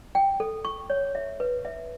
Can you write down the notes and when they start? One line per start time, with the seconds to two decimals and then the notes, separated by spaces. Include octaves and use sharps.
0.15 G5
0.40 A4
0.65 C#6
0.90 C#5
1.15 E5
1.40 B4
1.65 E5